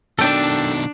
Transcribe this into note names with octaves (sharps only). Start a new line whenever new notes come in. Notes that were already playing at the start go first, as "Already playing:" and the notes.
B2 D#3 D4 A4 G5